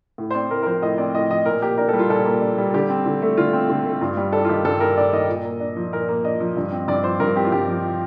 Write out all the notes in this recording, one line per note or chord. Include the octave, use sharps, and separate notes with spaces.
A2
C5
C4 D5
A2 A#4
A#4
F3 C5
A2 D#5
C4 D5
A2 D#5
F3 D#5
A#2 A#4
A#3 G4
D4 A#4
G3 A4
F4
A#2 A4
A#3
D4
G3
D3 G4
C4
D3
A3
D3 F4
C4
D3
A3
G2 F4
G3
D4 A4
F4
D#3 G4
G2 A4
G3 A#4
D4 D5
D#3 D#5
A#2
A#3
D4
F3
A#2 A#4
A#3
D4 D#5
F3
G2
C4
G2 D5
F3 C5
G2 A#4
C4 G4
F4
G2 G4
F3